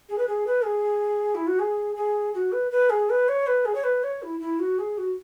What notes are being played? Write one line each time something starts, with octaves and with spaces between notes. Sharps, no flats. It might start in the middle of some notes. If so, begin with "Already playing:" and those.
G#4
B4
G#4
B4
G#4
E4
F#4
G#4
G#4
F#4
B4
B4
G#4
B4
C#5
B4
G#4
C#5
B4
C#5
E4
E4
F#4
G#4
F#4